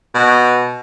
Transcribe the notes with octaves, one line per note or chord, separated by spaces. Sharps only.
B2